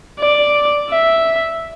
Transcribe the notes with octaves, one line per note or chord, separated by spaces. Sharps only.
D5
E5